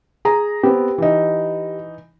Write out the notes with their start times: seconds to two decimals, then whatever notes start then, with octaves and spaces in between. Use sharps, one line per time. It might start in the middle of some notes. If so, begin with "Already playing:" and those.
0.25 G#4 A#5
0.63 B3 C4 G4
0.98 E3 D#4